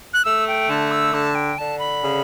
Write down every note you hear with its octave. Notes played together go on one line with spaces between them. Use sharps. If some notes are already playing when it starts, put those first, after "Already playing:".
F#6
A3 E6
G5
D3 A5
E6
D3 A5
G5
D3 A5
B5
C#3